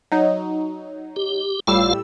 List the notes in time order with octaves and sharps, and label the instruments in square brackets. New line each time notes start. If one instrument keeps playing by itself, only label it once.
[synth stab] F#3 D#4
[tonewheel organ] G4
[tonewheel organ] G1 F4 F5 [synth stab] A2 G3 E6